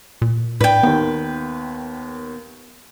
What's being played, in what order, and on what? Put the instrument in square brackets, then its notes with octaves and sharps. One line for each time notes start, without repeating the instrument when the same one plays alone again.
[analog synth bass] A#2
[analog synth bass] A2 [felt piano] D4 [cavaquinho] B4 G5
[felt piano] D#2 D#3 [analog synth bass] B3